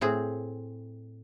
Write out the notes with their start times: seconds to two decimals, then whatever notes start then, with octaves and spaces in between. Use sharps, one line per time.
0.01 A2 C4 G#4